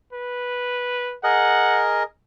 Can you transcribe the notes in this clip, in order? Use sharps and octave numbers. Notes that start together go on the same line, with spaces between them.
B4
G#4 A#4 D#5 F#5